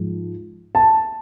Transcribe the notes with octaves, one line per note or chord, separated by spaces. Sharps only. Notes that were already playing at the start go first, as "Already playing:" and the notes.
Already playing: G#2 F3
A5